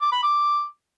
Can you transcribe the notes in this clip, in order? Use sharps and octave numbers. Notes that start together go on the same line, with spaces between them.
D6
B5
D6